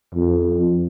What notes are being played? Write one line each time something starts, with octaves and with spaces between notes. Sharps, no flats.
F2